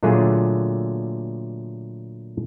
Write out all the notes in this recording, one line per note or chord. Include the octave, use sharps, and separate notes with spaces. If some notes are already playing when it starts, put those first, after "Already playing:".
A#2 D3 F#3 A3 F4 G#4